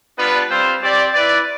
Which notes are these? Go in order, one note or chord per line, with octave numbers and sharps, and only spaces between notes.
G3 B3 D4 F4 B4
G3 C4 F4 C5
C4 G4 D5
E4 B4 D5